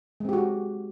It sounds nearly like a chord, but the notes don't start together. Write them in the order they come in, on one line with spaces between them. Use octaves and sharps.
G#3 C4 G4 F#4